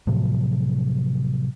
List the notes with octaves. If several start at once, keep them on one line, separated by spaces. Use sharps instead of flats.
A2 C3 F3 F#3